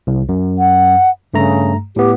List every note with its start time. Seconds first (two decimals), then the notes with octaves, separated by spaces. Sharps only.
0.07 C2
0.29 F#2
0.59 F#5
1.34 G2 C#3 A3 A#5
1.96 A2 B3 G4